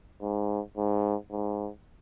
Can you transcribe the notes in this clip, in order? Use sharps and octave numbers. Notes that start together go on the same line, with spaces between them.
G#2
G#2
G#2